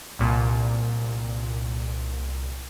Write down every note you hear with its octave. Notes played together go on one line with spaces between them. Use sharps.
C2 A#2